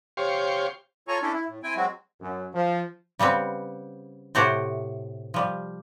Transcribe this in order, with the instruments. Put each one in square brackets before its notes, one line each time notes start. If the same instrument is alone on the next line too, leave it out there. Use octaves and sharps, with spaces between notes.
[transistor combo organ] G4 C5 C#5 F5
[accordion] F4 A4 C#5 G#5 A#5 C#6
A3 C#4 D4 E4 A4
E4
A2
C4 E4 G5 G#5
F#3 G#3 C4 F#4
[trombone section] F#2
F3
[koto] C#3 G3 B3 C4
A2 C3 A3 F#4 G4 C5
F3 G3